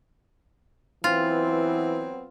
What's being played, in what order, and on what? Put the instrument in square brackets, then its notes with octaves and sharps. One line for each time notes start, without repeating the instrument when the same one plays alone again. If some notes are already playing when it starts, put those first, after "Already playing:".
[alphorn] E3 [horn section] F#3 B3 C4 [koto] F4